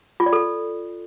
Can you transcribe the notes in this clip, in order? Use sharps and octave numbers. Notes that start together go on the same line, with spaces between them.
F4
D5
A4